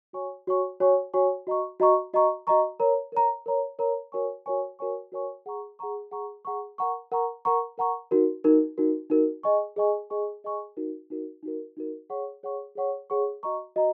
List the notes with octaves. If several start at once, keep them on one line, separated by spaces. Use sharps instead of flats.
F#4 C#5 G#5 C#6
F#4 C#5 G#5 C#6
F#4 C#5 G#5 C#6
F#4 C#5 G#5 C#6
F#4 D#5 A#5 C#6
F#4 D#5 A#5 C#6
F#4 D#5 A#5 C#6
F#4 D#5 A#5 C#6
A#4 C#5 A#5
A#4 C#5 A#5
A#4 C#5 A#5
A#4 C#5 A#5
F#4 A#4 C#5 G#5 C#6
F#4 A#4 C#5 G#5 C#6
F#4 A#4 C#5 G#5 C#6
F#4 A#4 C#5 G#5 C#6
G#4 F#5 A#5 C#6
G#4 F#5 A#5 C#6
G#4 F#5 A#5 C#6
G#4 F#5 A#5 C#6
A#4 F#5 A#5 C#6
A#4 F#5 A#5 C#6
A#4 F#5 A#5 C#6
A#4 F#5 A#5 C#6
D#4 F#4 A#4
D#4 F#4 A#4
D#4 F#4 A#4
D#4 F#4 A#4
G#4 D#5 G#5 C#6
G#4 D#5 G#5 C#6
G#4 D#5 G#5 C#6
G#4 D#5 G#5 C#6
D#4 F#4 A#4
D#4 F#4 A#4
D#4 F#4 A#4
D#4 F#4 A#4
G#4 C#5 F#5 C#6
G#4 C#5 F#5 C#6
G#4 C#5 F#5 C#6
G#4 C#5 F#5 C#6
F#4 D#5 A#5 C#6
F#4 D#5 A#5